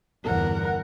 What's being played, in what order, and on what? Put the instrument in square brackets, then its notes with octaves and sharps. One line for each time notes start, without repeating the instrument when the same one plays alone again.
[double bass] G1 E2 [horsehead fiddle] A#4 F#5